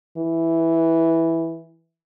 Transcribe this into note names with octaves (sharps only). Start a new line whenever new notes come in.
E3